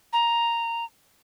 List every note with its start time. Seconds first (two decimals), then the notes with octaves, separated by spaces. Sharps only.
0.13 A#5